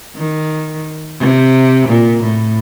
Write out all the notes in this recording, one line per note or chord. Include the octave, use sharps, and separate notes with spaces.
D#3
C3
A#2
A2